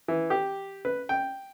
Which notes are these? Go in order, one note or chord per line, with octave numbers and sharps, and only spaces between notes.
E3
G4
B4
G5